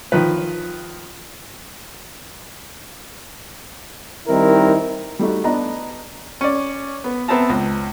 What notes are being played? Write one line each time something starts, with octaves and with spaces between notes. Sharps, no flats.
D#3 F3 B4
D#3 G3 C4 D#4 E4 A#4
G3 A3 D#4 F#4
B3 D4 D#5 A#5
C#4 D5
B3
B3 C4 E5 A5 A#5
C#2